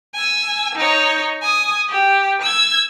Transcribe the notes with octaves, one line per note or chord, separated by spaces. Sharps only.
G#5 E6
D#4 C#5
G#5 D#6
G4
E6 G#6